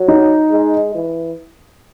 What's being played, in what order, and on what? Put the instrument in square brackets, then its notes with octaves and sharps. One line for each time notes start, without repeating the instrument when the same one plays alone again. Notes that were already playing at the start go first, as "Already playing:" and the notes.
Already playing: [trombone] F#3
[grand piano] D#4
[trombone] G#3
E3